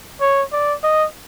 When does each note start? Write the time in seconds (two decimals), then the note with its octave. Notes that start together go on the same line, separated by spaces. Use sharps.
0.21 C#5
0.52 D5
0.84 D#5